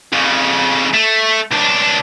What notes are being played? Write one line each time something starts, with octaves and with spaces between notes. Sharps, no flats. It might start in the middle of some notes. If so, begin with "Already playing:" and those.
F2 C#3
A3
C#2 D4